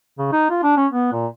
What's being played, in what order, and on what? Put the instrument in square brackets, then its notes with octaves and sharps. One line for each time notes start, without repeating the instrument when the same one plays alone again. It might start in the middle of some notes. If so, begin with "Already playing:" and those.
[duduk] C#3
D#4
F4
D4
C#4
B3
A#2